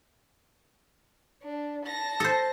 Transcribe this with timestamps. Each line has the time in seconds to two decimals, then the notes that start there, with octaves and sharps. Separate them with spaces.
1.43 D4
1.85 A5 A#6
2.20 A4 C5